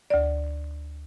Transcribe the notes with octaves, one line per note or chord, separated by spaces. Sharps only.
D2 D5